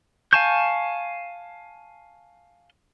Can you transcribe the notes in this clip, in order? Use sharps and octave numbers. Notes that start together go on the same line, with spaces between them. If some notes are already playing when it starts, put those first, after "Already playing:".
F5 G#5 A5 C#6 G6